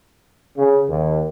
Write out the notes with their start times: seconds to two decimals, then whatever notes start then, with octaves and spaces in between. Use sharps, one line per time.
0.58 C#3
0.89 D#2